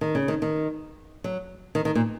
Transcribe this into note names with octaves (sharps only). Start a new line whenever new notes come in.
D#3
C#3
D#3
D#3
F#3
D#3
D#3
A#2